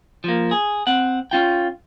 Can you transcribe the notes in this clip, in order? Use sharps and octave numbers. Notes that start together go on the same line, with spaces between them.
F3 A#3
G#4
C4 F#5
C#4 F4 G5